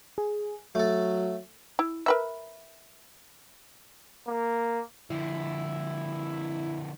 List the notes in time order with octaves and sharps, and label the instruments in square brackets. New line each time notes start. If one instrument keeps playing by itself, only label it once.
[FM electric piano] G#4
[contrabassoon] F#3 [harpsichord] A3 A4
[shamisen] E4
A#4 B4 E5
[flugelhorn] A#3
[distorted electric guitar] D3 F3 [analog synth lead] E4